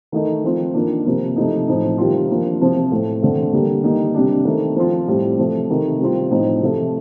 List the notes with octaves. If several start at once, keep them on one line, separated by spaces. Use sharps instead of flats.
D#3 A3 D#4
F3 C4 F4
D#3 A#3 D4 F4
C3 F3 A#3
C3 F3 A3 D#4
A2 F3 C4 D#4
C3 D#3 G3 C4 F4
F3 A#3 D4 F4
C3 F3 C4 F4
A2 A3 C4
D3 A3 C4
D3 G3 A#3
D#3 G3 A#3 D#4
C3 G3 D4
D#3 A3 C4
F3 C4 F4
A2 G3 C4
C3 F3 A3
C3 D#3 A3
C3 G3 C4 F4
A2 F3 C4 D#4
C3 F3 A3